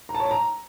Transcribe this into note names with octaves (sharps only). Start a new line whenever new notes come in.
A#5
A5
C#5
A5
A#5